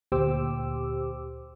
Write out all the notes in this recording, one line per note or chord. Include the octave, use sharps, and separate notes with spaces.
D2 A#2 G4 C5 D6 E6